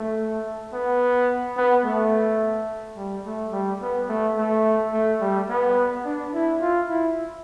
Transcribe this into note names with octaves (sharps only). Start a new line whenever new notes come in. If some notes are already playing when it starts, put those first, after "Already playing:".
Already playing: A3
B3
B3
A3
G3
A3
G3
B3
A3
A3
A3
G3
B3
D4
E4
F4
E4